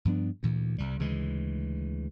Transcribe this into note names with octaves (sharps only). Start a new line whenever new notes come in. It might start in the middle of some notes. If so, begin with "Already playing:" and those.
G2 F3 B3 D4
D2 A#2 E3
C2 G3
D2 C#3 E3 G#3